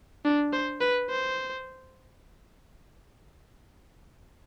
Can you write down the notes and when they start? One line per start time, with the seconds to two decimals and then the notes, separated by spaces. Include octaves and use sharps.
0.25 D4
0.53 C5
0.81 B4
1.10 C5